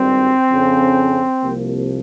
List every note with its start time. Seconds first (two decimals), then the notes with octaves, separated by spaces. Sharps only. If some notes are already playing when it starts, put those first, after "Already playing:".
Already playing: G#1 G2 G3 C4
0.50 F2 C#3 F3
1.42 C2 C3 F3 A#3